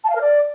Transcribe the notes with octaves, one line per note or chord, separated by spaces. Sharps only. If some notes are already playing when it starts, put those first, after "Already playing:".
A5
F5
A#4
D5